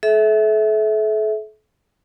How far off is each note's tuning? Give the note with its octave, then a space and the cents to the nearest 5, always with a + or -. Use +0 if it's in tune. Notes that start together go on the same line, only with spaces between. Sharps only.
A4 -40 E5 -15